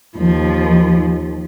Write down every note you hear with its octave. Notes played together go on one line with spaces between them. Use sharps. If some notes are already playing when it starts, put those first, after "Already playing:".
D#2 F3